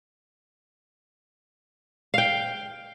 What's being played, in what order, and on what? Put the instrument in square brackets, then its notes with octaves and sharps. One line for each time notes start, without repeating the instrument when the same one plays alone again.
[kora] F5 G5